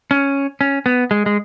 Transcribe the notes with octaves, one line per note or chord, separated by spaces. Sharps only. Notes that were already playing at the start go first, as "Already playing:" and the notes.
C#4
C#4
B3
G#3
G#3